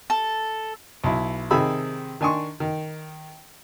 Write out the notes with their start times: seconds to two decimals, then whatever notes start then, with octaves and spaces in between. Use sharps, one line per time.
0.10 A4
1.04 B1 E4
1.51 C3 D#3 G#4 B5 E6
2.21 D#3 D4 G#5 C6 C#6
2.60 D#3